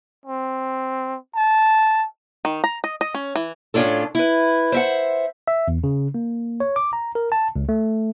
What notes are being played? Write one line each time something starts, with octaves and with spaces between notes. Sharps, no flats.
C4
A5
D#3
A#5
D#5
D#5
C#4
E3
A2 C#4 D4 F4 A4
E4 B4
C5 E5 F#5
E5
E2
C#3
A#3
C#5
D6
A#5
A#4
A5
C#2
A3